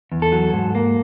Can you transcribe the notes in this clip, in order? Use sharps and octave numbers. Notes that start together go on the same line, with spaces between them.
E2
A4
F#3
G#2
A#3